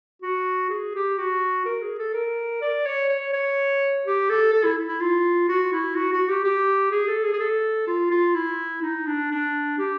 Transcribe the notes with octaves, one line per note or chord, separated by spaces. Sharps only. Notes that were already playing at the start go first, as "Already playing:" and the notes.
F#4
G#4
G4
F#4
A#4
G#4
A4
A#4
D5
C#5
C#5
C#5
G4
A4
A4
E4
E4
F4
F#4
E4
F#4
F#4
G4
G4
G#4
A4
G#4
G#4
A4
F4
F4
E4
D#4
D4
D4
G4